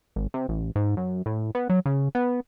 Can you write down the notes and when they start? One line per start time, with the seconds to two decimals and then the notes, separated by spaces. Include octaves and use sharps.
0.16 G#1
0.34 C3
0.48 A1
0.76 G#2
0.97 F#2
1.26 A2
1.55 B3
1.69 F#3
1.86 C#3
2.15 B3